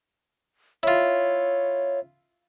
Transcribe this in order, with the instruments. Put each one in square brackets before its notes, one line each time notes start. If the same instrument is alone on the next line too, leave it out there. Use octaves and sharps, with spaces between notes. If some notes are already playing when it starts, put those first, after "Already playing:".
[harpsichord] E4 F4 [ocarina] C#5